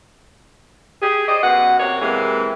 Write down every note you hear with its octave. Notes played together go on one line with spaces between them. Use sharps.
G4 G#4
C5 D5 D#5
F#2 B2 F#5
C3 A#3 C#5
C3 E3 G#3 A#3